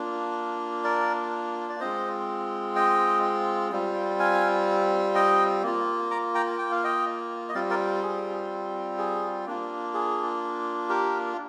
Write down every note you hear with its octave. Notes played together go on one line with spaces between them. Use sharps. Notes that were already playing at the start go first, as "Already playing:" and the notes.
Already playing: A#3 D4 F4
A#4 D5
D5
G#3 C4 F4 C5 D#5
D#5 G5
G3 C4 F4
F5 G#5
D#5 G5
A#3 F4
A#5 D6
G5 A#5
G5
F5
D#5 G5
D#5
G3 C4 F4 D5 F5
A#4 D5
G#4
G#4
A#3 D4 F4
G#4
G4 A#4